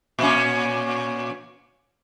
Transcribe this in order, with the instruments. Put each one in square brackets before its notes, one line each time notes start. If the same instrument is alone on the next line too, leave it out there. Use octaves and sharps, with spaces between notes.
[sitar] A#2 C#4